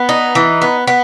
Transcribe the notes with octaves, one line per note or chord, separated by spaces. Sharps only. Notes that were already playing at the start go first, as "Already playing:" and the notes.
Already playing: B3
D#4
E3
B3
B3